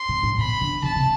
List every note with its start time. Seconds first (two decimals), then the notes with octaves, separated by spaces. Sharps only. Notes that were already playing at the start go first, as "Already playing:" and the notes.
Already playing: C6
0.09 B2
0.23 A2
0.38 B2 B5
0.61 D3
0.83 B2 A5
0.95 C3